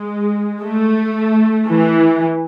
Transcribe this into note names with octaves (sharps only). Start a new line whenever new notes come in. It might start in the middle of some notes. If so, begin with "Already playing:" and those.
Already playing: G#3
A3
E3